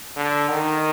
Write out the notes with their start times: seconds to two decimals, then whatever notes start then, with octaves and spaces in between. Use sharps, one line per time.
0.17 D3
0.49 D#3